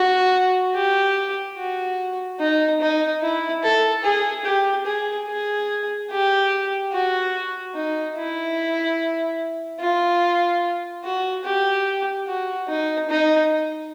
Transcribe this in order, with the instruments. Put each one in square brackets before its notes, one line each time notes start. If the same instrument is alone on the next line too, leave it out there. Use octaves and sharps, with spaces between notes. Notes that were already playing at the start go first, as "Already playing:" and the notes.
Already playing: [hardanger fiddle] F#4
G4
F#4
D#4
D#4
E4
A4
G#4
G4
G#4
G#4
G4
F#4
D#4
E4
F4
F#4
G4
F#4
D#4
D#4